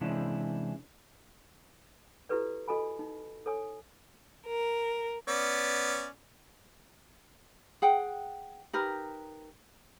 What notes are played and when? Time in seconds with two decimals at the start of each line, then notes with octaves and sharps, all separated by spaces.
0.01 C3 E3 G#3 C#4 D4 E4
2.29 E4 F#4 G4 A4 B4 D5
2.68 F#4 A4 D#5 G#5 B5
2.99 D#4
3.46 A4 C#5 G#5 D#6
4.45 A#4
5.28 B3 C#4 D5
7.82 G#4 F#5 G5
8.73 D#4 G4 A#4 B4